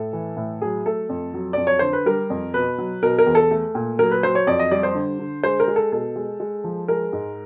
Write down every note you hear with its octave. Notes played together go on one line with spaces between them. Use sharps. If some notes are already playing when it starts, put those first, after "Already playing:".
Already playing: A2 A4
E3
A2
F#3 G#4
A3 A4
F2
F#3
F2 D5
C#5
D3 C5
B4
G3 A#4
F2
B2 B4
F#3
B2 A#4
A#4
E2
A4
A3
A#2
F#3 A#4
B4
F#3 C5
C#5
F2 D5
D#5
G3 D5
C5
D3
D3
G#3 C5
A#4
G#3
A4
B2 A4
G#3
G#3
F3
G#3 A#4
G#2